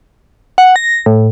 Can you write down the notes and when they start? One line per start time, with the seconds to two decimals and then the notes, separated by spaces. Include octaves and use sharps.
0.58 F#5
0.76 A#6
1.06 A2